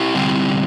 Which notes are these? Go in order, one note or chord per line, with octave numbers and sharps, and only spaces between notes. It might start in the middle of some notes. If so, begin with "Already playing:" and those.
Already playing: E4 G4
D3 G3 C4